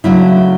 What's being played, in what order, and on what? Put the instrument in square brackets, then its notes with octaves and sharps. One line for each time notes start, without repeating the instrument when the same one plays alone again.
[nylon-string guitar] C#3 F#3 A3 D4 E4